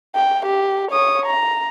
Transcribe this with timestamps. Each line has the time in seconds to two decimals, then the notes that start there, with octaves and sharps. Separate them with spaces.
0.15 G5
0.46 G4
0.91 C#5 D#6
1.26 A#5